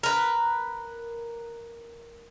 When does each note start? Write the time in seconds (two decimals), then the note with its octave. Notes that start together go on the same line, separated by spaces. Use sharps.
0.03 A#4 B4